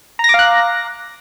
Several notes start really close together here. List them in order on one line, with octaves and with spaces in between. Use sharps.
A#5 A#6 D6 F5 F#6